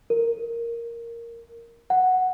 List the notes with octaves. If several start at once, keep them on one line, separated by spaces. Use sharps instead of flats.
A#4
F#5